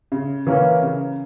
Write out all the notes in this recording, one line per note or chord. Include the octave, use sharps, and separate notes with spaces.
C#3
E3 A#3 C#4
C#3